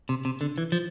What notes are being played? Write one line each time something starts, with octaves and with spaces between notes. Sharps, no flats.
C3
C3
D3
E3
F3